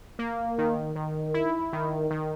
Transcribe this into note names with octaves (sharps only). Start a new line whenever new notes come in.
A#3
D#3
D#3
E4
D#3
D#3